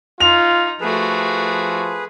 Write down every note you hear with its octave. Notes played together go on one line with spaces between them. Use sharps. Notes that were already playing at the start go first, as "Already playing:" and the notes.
D#4 F4 F7
F3 A3 F#4 G#4 B4